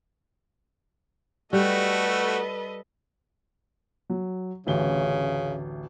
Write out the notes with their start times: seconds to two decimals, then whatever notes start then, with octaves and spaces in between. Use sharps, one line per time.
1.53 G3 A3 F#4 A4 B4 D#5
4.10 F#3
4.67 A1 D2 C#3 G7